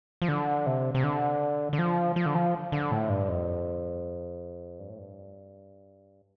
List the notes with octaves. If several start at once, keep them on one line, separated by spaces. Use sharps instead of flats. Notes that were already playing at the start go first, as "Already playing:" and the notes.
F3
D3
C3
C3
D3
D3
F3
F3
D3
F3
D3
A2
G2
F2
G2
A2
G2